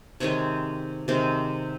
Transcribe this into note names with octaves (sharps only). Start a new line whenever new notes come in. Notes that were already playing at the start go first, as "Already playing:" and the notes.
C3 D#3 G#3 C#5
C3 D#3 G#3